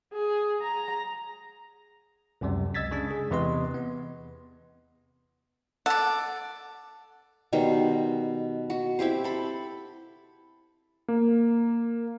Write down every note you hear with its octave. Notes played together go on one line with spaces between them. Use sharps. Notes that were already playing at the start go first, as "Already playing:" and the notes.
G#4
A#5
C#2 F#2 C3 G3
D#5 E6 G#6 A6 B6
C#3 G#3 D4
G#4
E2 C3 E3 B4 D#5 C6
B3
A4 D5 F#5
B2 D#3 G3 C5
F#4
C4 E4 G4 C5
A4 B5
A#3